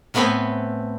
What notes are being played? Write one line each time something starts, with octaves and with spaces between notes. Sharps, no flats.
A2 A3 B3 C4 B4 G#5